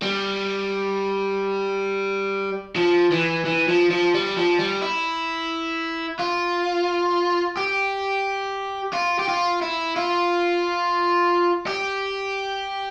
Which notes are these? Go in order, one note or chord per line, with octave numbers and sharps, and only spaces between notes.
G3
F3
E3
E3
F3
F3
G3
F3
G3
E4
F4
G4
F4
G4
F4
E4
F4
G4